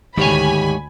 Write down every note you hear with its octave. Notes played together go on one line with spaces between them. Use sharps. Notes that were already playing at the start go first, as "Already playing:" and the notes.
D2 G#2 D#3 G4 C#5 G#5 B5